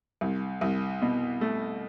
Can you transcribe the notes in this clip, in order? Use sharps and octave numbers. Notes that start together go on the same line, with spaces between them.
C2
C2
B2
A3